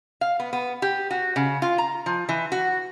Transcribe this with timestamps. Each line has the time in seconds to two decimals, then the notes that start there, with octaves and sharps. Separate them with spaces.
0.21 F5
0.40 B3
0.53 B3
0.82 G4
1.11 F#4
1.36 C#3
1.62 F4
1.78 A#5
2.06 F3
2.29 E3
2.52 F#4